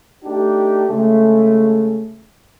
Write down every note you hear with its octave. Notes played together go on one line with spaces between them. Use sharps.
A3 D4 D#4 G4
C#3 G#3 A3